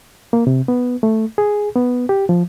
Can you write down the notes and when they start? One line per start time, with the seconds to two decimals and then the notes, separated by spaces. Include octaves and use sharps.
0.33 A#3
0.47 C3
0.68 B3
1.03 A3
1.38 G#4
1.76 B3
2.09 G4
2.29 F3